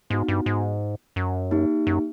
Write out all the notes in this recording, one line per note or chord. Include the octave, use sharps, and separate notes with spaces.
G#2 B3 D#4 F#4
G2
G#2
F#2
A#3 D#4 G4
F#2